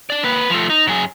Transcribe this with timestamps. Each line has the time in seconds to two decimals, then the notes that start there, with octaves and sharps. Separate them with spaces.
0.10 D4 D5
0.24 A#3 B4
0.50 F3 A3
0.70 D#4
0.87 F#2 G#4